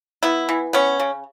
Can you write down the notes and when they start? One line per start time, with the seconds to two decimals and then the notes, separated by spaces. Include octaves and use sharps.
0.23 B3 E4
0.49 E3
0.73 B3 C#4
1.00 C#3